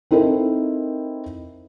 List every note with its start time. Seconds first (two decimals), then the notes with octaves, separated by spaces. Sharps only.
0.11 C4 D#4 E4 A4 A#4